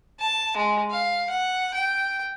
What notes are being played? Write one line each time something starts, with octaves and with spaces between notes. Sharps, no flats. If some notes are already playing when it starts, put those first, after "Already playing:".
A5
G#3
F5
F#5
G5